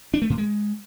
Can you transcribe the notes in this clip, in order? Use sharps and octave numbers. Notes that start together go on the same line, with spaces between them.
D4
A3
A2
G#3